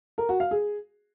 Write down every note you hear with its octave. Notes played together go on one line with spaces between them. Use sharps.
A#4
F#4
F5
G#4